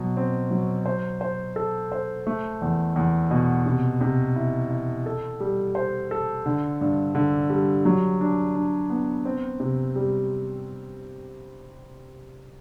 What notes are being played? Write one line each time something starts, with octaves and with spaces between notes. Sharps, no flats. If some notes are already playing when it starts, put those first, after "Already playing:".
Already playing: B2 F#3
C4
F#3
C5
C5
A4
C5
A3
E2
E2
B2
C3
C3
E4
E4
A4
G3
C5
A4
D3
G2
D3
G3
F#3
D4
D4
B3
C4
C3
G3